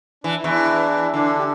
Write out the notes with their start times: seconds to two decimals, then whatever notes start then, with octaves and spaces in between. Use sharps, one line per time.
0.24 E3 D4
0.36 E4
0.44 E2 E3 D4
1.13 D3 D4
1.39 G4